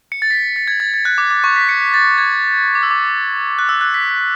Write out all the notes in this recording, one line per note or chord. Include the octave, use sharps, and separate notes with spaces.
C#7
A6
B6
A6
G#6
A6
A6
F#6
D6
D6
C#6
B6
C#7
B6
A6
G#6
D6
E6
D6
F#6
E6
F#6
B6